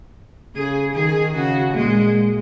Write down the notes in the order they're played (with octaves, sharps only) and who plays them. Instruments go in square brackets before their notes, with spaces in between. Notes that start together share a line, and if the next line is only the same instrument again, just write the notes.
[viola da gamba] C#3 [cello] G#4
[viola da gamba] D#3 [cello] G#4
[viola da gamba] C#3 [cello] F#4
[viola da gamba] A#2 [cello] G#3